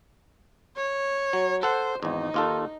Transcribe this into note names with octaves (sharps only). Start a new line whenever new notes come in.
C#5
F#3
A4 C5 F#5
G#1 E2 D#4
D#2 F4 A4